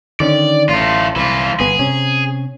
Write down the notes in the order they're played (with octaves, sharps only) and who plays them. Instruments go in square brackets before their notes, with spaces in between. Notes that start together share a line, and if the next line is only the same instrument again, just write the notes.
[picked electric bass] D3 D#3 C#4 [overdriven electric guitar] D5
[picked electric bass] A1 [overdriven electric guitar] A3 F4
[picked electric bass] C2 [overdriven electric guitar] E3 F4
[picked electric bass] G1 B3 [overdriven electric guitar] G#4
[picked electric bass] C3 C#4